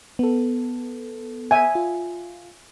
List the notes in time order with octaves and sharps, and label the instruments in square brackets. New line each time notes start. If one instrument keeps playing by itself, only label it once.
[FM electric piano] B3 A4
[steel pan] E5 G#5
[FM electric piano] F4